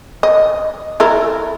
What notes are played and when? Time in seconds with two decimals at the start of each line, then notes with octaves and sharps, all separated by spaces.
0.23 D#5
1.00 E4 A4 A#4